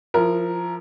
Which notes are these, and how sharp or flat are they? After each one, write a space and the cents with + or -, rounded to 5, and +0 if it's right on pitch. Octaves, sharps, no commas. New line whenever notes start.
F3 +0 E4 +30 A#4 +0